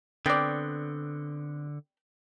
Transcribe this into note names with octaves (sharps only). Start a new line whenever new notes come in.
D3 B3 C4 D5 G5